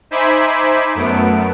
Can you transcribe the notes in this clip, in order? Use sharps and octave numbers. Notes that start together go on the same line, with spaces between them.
D#4 C5 E5 G#5 B5 D6
F#2 A3 B3 D7